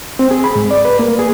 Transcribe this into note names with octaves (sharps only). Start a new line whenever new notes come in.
C4
G#4
B5
G#2
D5
B4
A#3
G#4